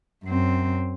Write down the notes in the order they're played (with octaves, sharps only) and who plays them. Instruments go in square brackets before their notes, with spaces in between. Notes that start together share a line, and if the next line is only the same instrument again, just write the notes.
[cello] F#2 C4